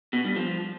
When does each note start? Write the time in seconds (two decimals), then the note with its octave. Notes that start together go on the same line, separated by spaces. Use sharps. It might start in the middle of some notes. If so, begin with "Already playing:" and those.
0.13 B2
0.25 G2
0.36 F3